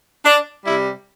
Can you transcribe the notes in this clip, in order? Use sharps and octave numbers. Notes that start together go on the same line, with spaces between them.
D4
C3 G3 E4